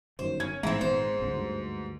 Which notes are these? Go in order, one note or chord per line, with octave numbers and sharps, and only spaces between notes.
G1 F#2 D#3 C5
C#4 G#6
A1 G#2 C4 E4
G#1 A#2 B3 C5
G1 C#2
D2 G2